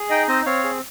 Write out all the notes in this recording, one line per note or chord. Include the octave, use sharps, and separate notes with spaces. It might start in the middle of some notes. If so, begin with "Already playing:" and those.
Already playing: G#4
D#4 D#5 G5
C4 C5 D#5
C4 C#5 F5
G#4